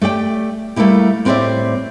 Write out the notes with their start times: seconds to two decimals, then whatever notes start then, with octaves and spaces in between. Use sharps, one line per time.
0.01 A3 G4 D5 G5
0.76 G3 A3 A#3 D#4 E4 G4
1.25 A2 C4 F#4 G4 D5 E5